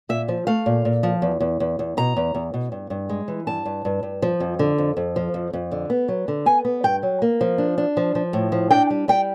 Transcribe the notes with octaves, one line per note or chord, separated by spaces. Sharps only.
A#2 E5
F3
A3 F5
A#2
A#2
F3
E2
E2
E2
E2
B2 A#5
E2
E2
B2
G2
G2
G#3
E3
G2 A5
G2
G2
G2
F3
F2
D3
F2
F2
F3
F2
F2
D3
B3
F#3
D3
B3 G#5
B3
G2 G5
F#3
A#3
F3
D4
D4
F3
F3
A2
F3
D4 G5
G3
G3 G5